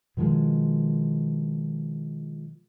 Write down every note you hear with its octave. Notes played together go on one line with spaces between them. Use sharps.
B2 D#3 F3 G#3